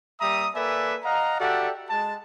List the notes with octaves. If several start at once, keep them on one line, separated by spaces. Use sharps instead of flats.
G3 A#3 E5 A#5 D#6
A#3 A4 B4 D5 E5 G#5
D#5 F5 F#5 A#5
F#4 G4 A4 D5 E5 F#5
G#3 A5